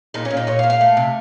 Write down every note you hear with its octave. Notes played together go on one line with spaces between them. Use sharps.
A#2 D#4
C#4
A#2
D#4
A#2 C#5
F5
A#2
F5
A3
C3